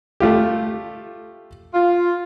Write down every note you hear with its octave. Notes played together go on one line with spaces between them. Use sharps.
A3 F4 G4
F4